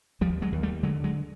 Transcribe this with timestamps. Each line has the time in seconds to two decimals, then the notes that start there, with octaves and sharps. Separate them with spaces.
0.21 D#2 F3 G3
0.42 F#3 G#3
0.52 D#2
0.63 G3 A3
0.83 D3 F#3 G#3
1.04 F#3 G#3